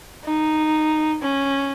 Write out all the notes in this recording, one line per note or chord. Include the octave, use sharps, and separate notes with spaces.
D#4
C#4